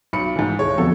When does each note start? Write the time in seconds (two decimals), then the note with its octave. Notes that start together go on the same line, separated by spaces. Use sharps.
0.13 B1 B5 C#7
0.36 G#2 E3
0.59 D#1 G#3 C#5
0.78 F2 B2 D3 A4